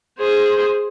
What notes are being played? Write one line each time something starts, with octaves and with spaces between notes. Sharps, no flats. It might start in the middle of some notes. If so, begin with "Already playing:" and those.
G#4 C5